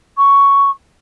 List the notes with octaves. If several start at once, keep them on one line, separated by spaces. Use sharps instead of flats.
C#6